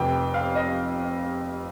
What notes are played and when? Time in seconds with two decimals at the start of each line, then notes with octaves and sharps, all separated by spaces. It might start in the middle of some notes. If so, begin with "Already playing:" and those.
Already playing: F1 F2 C3 G5
0.34 F5
0.55 D#5